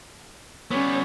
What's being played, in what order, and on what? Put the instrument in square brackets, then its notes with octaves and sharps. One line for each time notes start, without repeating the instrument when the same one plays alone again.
[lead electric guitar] G3 B3 [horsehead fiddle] C#4 C#5